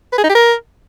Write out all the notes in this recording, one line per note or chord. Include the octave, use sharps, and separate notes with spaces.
B4
G#4
D#4
G4
A#4